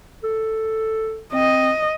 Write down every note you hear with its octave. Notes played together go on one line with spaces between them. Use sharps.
A4
C4 D#5